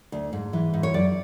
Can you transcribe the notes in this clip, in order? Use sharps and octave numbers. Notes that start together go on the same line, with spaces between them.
D2
G#2
E3
G#2
C#5
F#2 D5